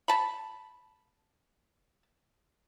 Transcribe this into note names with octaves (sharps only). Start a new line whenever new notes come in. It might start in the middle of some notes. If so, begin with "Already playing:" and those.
A5 B5